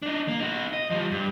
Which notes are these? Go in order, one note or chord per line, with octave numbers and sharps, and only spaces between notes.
D4 D#4
A#3
D#4 F#4
D#5
F3 G3
G2